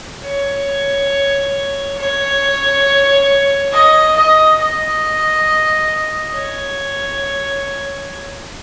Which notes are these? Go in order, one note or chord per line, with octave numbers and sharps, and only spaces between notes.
C#5
C#5
D#5
D#5
D#5
C#5